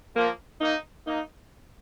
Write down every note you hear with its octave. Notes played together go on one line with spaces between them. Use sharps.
F3 A#3
A#3 D#4
A#3 D#4